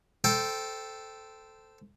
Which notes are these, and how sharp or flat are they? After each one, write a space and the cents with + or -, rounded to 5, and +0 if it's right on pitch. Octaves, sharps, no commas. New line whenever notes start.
A4 +0 C5 -15 G5 +0